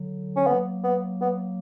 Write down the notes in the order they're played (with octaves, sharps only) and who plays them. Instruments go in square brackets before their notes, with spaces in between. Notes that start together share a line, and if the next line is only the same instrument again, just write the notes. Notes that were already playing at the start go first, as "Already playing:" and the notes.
Already playing: [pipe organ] D3 F#3
[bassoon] C#4
[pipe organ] F#3 A#3 [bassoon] B3
[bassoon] B3
B3